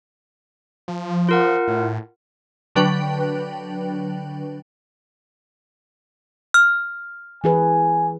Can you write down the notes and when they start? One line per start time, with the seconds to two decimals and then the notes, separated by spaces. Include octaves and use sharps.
0.88 F3
1.29 F4 A#4 F#5
1.68 A2
2.76 D3 F#3 D4 B4 G5
6.54 F6
7.44 E3 G#4 B4 G#5